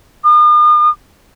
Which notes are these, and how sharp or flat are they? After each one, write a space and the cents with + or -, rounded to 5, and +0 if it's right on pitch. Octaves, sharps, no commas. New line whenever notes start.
D#6 -45